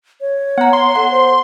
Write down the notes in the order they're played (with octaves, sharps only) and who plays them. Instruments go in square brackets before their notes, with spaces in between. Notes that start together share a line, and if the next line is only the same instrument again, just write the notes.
[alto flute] C#5
[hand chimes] B3 A#5 [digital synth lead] F#5
[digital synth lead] C6
[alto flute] A4 [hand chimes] F#5
[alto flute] C5